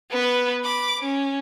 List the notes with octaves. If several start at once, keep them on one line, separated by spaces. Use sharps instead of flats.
B3 B4
B5 D6
C#4